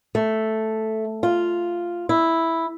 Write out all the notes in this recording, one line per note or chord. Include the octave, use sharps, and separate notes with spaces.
A3
F4
E4